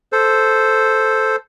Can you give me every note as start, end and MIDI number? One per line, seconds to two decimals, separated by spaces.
0.12 1.36 69
0.12 1.36 72